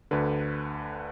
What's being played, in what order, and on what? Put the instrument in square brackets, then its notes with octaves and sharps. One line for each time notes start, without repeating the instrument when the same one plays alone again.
[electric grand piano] D2 D3 B4